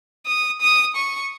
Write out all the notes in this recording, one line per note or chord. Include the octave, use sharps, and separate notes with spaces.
D#6
D#6
C#6